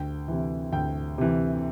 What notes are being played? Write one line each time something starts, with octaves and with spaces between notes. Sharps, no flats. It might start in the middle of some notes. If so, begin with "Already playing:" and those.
Already playing: D2 G5
C3 E3
D2 G5
C3 E3